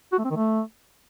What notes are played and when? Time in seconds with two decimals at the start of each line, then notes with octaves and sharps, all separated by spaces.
0.13 F#4
0.19 A3
0.25 C4
0.31 D#3
0.37 A3